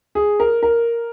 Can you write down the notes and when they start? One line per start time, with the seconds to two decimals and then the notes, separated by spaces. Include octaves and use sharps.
0.15 G#4
0.40 A#4
0.63 A#4